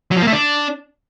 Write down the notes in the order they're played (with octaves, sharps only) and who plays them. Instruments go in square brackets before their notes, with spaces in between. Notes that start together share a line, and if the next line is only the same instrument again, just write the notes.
[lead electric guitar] F#3
F3
A#3
A3
D4